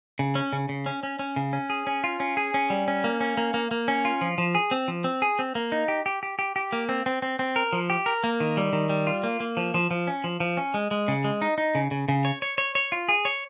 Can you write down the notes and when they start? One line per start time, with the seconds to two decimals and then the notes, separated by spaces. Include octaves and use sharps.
0.19 C#3
0.35 C#4
0.53 C#3
0.69 C#3
0.86 C#4
1.03 C#4
1.19 C#4
1.36 C#3
1.53 C#4
1.70 G#4
1.87 C#4
2.04 F4
2.20 C#4
2.37 G#4
2.54 C#4
2.70 G3
2.88 C#4
3.04 A#3
3.21 C#4
3.37 A#3
3.54 A#3
3.71 A#3
3.88 C#4
4.05 F4
4.21 F3
4.38 F3
4.55 G#4
4.71 C4
4.88 F3
5.04 C4
5.22 G#4
5.39 C4
5.55 A#3
5.72 D#4
5.88 G4
6.06 G4
6.23 G4
6.39 G4
6.56 G4
6.72 A#3
6.89 C4
7.06 C4
7.22 C4
7.39 C4
7.56 A#4
7.73 F3
7.90 G4
8.06 A#4
8.24 A#3
8.40 D#3
8.57 G3
8.73 D#3
8.89 G3
9.07 F4
9.23 A#3
9.40 A#3
9.57 F3
9.74 F3
9.91 F3
10.07 C#4
10.24 F3
10.40 F3
10.57 C#4
10.74 G#3
10.91 G#3
11.08 C#3
11.24 G#3
11.42 D#4
11.58 D#4
11.75 C#3
11.91 C#3
12.08 C#3
12.25 C#5
12.42 C#5
12.58 C#5
12.75 C#5
12.92 F4
13.09 G#4
13.25 C#5